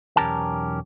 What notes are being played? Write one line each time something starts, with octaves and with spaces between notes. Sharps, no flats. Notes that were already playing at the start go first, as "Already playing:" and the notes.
B1 E2 C#4 G4 A#4 A5